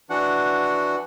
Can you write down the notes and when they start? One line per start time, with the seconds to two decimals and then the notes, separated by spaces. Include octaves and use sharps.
0.10 E3 D4 F#4 F#5